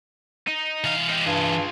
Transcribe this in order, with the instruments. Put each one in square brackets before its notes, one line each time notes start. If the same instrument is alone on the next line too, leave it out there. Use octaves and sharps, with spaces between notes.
[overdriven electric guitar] D#4
[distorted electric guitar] E3 F5
[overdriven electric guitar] D#4 G4
[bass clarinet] G2 [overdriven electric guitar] F4 G#4